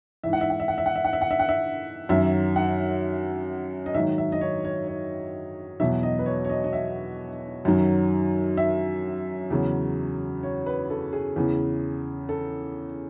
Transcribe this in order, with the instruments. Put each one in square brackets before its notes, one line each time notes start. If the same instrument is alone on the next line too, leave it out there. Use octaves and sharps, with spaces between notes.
[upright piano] G#2 E3 E5
F#5
E5
F#5
E5
F#5
E5
F#5
E5
F#5
E5
F#5
E5
F#5
E5
F#2 D#3 F#3 E5
F#5
D#5
G#2 D#3 F#3 E5
E5
D#5
C#5
C#5
C#5
E2 B2 F#3 E5
D#5
B4
C#5
C#5
D#5
D#5
E5
F#2 D#3 F#3
E5
E2 C#3 F#3
C#5
B4
A4
G#4
E2 C#3 E3
A4